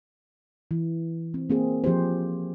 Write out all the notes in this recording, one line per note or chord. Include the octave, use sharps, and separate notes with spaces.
E3
C4
A#3 C4 G#4
F3 G4 G#4 C5